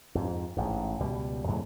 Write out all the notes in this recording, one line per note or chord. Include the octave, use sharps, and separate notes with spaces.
F2 G#2
A1 G#2
C#2 B2 G3
F2 A2 C#3